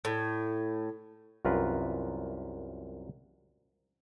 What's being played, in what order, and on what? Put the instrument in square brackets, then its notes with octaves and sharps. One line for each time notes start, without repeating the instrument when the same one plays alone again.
[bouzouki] A2
[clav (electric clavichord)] C2 F#2 F4 A#4 B4